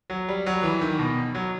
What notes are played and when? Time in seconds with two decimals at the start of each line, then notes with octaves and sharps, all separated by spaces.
0.10 F#3
0.28 G3
0.46 F#3
0.63 E3
0.81 D#3
0.99 B2
1.35 F#3